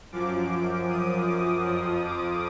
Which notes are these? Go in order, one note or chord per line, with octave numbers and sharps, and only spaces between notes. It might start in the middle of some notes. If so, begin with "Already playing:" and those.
F#2 F3 D6
D6
D#6
D6
F2 F3 D#6
D6